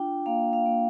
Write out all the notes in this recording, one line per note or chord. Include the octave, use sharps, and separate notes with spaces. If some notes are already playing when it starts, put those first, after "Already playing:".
Already playing: D4 F4 G5
A#3 F5
F5
A#3